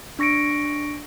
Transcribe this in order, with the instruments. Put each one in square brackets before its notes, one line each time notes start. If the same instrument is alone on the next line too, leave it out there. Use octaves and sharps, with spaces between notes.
[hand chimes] D4 C#6 A#6 C#7 D7